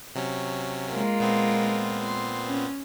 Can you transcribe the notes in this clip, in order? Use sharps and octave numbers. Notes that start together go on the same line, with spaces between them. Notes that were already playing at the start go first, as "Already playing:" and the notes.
C3 F#3 C#4
G#3 A#3 F4
A#2 B3 C4
C6
C#4